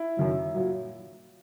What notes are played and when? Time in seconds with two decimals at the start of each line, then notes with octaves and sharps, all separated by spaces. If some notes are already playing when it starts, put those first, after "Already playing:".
Already playing: E4
0.17 F#2 D#3 F#3
0.54 A#2 F#3